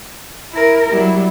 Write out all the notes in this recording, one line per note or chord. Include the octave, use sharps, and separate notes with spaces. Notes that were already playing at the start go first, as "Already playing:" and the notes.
E4 A#4
F#3 G3 E4